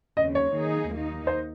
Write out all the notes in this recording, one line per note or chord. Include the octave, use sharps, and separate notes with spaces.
D#2 C#3 F#3 C4 D#5
C#5
D#3 A#3 D#4 G#4
D#2 D#3 A#3 D#4
C5